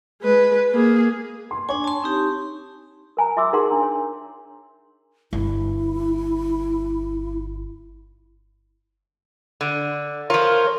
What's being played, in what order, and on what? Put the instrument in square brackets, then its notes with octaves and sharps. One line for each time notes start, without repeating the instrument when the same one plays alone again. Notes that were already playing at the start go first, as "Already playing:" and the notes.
[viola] G#3 B4
A#3 G#4
[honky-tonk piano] C6
[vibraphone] D4 G#5 [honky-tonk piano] C#5
[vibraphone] A5 C6
C4 D#4 G4
[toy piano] A#4 G#5 A#5
F4 E5 C6 D6 E6
D#4 G#4 A#4 F#5 C6
D4 A#5
C#5
[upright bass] G1 [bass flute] E4
[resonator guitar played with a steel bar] D3
[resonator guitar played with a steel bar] F3 F4 [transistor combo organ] A#4 C#5